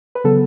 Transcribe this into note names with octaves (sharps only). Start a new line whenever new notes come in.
B4
C#3 F#3 B3 A4